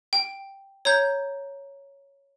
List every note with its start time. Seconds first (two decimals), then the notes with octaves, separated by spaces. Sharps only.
0.13 G5
0.85 C#5 A#5 G6